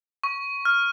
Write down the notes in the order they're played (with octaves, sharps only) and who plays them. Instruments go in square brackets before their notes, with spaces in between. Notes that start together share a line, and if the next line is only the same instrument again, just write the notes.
[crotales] C#6
F6